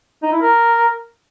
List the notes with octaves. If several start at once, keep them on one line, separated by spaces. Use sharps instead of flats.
D#4
E4
A#4